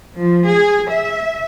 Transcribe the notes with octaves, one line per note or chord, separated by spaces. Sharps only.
F3
G#4
E5